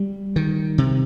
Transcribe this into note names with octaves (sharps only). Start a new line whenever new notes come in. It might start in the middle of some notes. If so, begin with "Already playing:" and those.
Already playing: G3
D#3
C3